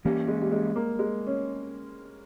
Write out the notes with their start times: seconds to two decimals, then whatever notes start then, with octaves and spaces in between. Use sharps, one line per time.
0.04 E3 G3 A#3 C#4
0.28 G#3
0.41 G3
0.52 G#3
0.76 A#3
0.99 G#3
1.27 C#4